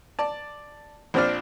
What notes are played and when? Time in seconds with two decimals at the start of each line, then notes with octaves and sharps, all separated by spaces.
0.19 D5 A5
1.14 A#1 F3 C4 D4 D5 F6